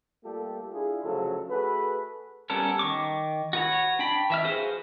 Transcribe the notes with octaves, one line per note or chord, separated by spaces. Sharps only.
G3 A3 A#3 F4 G4 A4
D4 E4 F4 G#4
D2 C#3 F3 F#3 A4
A3 F#4 G#4 A4 B4
G3 B3 C#4 A4 A#4
D#3 C#6 D6
F#4 B4 C#5
D4 G5 B5
E3 E5 F6
F#4 G#4 B4 C5 F5